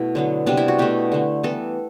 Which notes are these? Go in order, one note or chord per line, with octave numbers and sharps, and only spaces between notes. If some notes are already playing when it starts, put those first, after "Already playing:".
Already playing: B2 A3 E4
D3 F#3 B3
C3 G3 B3 D4
E4
F#4
B2 A3 G4
D3 A3
E3 G3 B3 A4